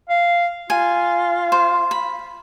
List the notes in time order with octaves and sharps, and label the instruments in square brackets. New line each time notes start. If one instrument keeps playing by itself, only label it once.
[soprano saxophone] F5
[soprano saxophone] F4 [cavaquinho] G#5
[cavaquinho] C5
B5